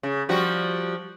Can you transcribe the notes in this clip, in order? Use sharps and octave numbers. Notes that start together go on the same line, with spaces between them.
C#3
F3 G3 F#4